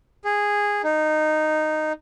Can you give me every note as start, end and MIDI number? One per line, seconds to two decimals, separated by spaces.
0.24 0.82 68
0.84 1.93 63